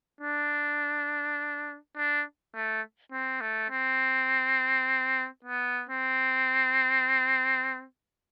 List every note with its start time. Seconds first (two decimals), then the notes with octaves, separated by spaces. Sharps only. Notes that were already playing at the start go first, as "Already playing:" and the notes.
0.21 D4
1.96 D4
2.55 A3
3.12 C4
3.41 A3
3.70 C4
5.45 B3
5.89 C4